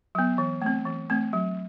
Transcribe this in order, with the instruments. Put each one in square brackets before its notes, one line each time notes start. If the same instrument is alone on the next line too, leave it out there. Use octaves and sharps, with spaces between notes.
[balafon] F#3 B3
E3
A3 C4
E3
A3 C4
F#3